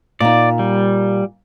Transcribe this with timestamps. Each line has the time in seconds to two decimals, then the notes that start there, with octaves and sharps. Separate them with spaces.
0.21 A#2 D#4 D5
0.59 G3